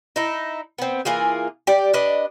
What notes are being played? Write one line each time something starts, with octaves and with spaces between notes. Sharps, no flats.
D#4 E4
B3 C4
E3 A#3 F4 G#4
G4 D5
D4 B4 D#5